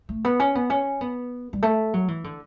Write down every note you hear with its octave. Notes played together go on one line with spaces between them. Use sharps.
A3
B3
C#4
B3
C#4
B3
G3
A3
F#3
E3
D3